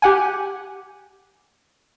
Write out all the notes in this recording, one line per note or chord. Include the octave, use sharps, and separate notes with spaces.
G4 F#5 G#5